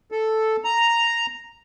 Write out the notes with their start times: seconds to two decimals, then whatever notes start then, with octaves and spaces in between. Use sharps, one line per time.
0.12 A4
0.64 A#5